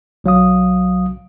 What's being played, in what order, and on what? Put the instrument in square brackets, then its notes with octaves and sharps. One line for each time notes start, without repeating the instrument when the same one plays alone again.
[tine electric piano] B1 F#3 F5 D#6